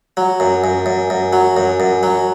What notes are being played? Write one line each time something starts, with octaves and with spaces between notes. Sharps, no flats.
F#3
F#2
F#2
F#2
F#2
F#3
F#2
F#2
F#3